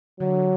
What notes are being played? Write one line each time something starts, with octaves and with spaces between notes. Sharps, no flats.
D3 F#3
D3